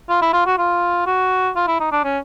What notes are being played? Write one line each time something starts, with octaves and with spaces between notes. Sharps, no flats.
F4
E4
F4
F#4
F4
F#4
F4
E4
D#4
D4
C#4